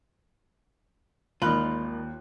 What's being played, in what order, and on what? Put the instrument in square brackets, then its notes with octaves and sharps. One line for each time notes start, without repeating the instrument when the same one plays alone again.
[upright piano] G#1 F#6 F#7 [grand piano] D#2 [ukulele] D#4 A#4 B5 [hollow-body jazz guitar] F4